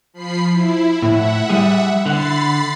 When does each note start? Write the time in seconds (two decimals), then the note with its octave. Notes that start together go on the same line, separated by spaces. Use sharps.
0.14 F3 B5 C7
0.52 E4
1.02 A2 E5 F#5
1.50 G3 G#4
2.06 D3 F#5 B5 A6 C7